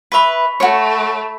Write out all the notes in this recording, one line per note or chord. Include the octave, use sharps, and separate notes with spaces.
B4 E5 B5 C#6 B6
A3 F#4 C#5